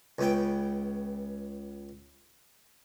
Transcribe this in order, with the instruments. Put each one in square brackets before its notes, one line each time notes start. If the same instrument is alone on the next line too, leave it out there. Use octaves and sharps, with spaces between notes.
[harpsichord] C#2 B3 G5